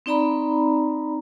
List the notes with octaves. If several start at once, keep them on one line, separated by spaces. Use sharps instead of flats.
C4 D#4 D5 A#5 B5